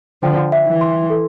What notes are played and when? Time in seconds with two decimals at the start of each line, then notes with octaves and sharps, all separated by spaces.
0.22 D3 F3 G5
0.52 E5
0.66 E3
0.81 C6
1.10 A4